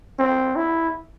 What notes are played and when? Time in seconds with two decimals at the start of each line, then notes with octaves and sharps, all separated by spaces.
0.19 C4
0.56 E4